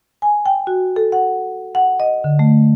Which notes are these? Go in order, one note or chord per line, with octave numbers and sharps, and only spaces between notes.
G#5
G5
F#4
A4
F#5
F#5
D#5
D3
A3